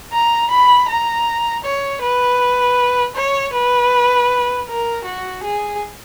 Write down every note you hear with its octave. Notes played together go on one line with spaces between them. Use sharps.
A#5
B5
A#5
C#5
B4
C#5
B4
A#4
F#4
G#4